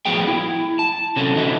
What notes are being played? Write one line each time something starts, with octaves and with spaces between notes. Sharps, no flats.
A2 F3 B3 F#4 G#4 G5
E4
A5
C3 F#3 C#4 A4
D3 D#3 D#4 E4 F#4